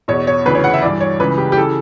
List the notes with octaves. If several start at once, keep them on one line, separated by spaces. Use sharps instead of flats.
E2 B2 C#5
C#5
D2 C#3 E3 B4
C#5
F#5
E5
G2 E3 D5
C#5
C#2 C#3 E3 B4
G4
G4
C#3 E3 A4